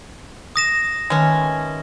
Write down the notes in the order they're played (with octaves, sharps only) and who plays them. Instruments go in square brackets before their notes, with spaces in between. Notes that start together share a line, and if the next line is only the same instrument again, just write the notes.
[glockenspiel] D#6 A#6 E7
[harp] D#3 A3 B4 [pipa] G#3 C#4